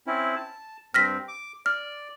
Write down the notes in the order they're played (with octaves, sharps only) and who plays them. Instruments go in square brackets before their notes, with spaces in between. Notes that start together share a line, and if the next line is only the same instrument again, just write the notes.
[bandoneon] C4 C#4 E4
A5
[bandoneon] G2 C4 [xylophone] F6 A#6 B6
[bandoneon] D6
[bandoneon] D5 [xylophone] F6